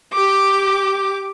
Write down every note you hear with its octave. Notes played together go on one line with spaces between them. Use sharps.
G4 D6